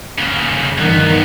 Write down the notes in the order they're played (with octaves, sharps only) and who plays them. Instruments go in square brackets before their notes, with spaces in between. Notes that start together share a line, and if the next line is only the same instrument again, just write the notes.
[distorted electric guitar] D#2 C#3
[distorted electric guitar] G2 B3 [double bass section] D#3